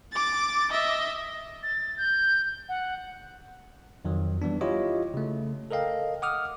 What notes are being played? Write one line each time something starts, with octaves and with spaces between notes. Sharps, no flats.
D6 A6
D#5 E5
A6
G6
F#5
F2 D#3 F#3
E3 G3 B3 D4
E4 F4 G4 C#5 D#5
C#3 A3
A4 A#4 D#5 F5 G5
F#5 D6 D#6 F6